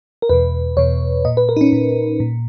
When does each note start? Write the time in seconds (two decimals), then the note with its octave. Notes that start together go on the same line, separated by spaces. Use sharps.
0.22 A#4
0.29 E2 B2 B4
0.77 E2 B2 C#5
1.25 A#2 D#5
1.37 B4
1.49 A#4
1.57 D#4
1.61 C#4
1.73 A#2
2.20 A#2